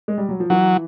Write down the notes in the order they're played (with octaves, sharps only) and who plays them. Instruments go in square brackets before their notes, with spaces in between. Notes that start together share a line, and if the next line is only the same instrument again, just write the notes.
[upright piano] G#3
G3
F#3
F3
[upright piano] E3 [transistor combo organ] F#3